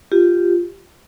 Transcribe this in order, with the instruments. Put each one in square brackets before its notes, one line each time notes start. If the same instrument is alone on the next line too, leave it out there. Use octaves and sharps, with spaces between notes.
[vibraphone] F4 G4